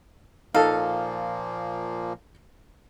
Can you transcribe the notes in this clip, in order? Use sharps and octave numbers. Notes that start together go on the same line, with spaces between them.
A#2 F3 A#3 D#4 A4 F5